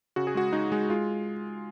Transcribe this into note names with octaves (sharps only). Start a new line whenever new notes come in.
C#3 F#4
G#4
G#3 F#4
G#3 D#4
G#3
G#3 F4